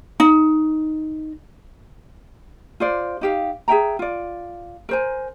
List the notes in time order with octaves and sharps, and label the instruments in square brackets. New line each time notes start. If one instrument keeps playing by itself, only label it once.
[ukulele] D#4
F4 C5 D5
D#4 G4 F5
G#4 E5 G5 A#5
F4 D5
A#4 C5 G#5